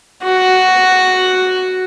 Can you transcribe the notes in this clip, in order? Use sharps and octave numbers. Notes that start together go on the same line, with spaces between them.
F#4